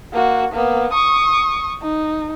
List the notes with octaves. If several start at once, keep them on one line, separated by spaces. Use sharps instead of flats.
A#3 F#4
A#3 B3
C#6 D#6
D#4